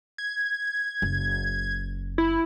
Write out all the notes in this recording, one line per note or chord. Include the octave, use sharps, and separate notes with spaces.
G#6
F#1
E4